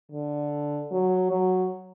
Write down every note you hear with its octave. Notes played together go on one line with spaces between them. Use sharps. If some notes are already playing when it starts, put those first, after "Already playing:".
D3
F#3
F#3